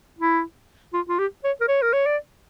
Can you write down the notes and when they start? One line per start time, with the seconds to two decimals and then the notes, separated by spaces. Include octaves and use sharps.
0.19 E4
0.93 F4
1.09 F4
1.19 G4
1.44 C#5
1.61 A#4
1.68 C#5
1.82 A#4
1.93 C#5
2.06 D5